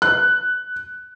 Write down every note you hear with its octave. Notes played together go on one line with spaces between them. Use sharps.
F#6